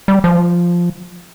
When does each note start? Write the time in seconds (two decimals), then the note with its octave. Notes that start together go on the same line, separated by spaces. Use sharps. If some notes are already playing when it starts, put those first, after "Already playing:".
0.08 G3
0.24 F3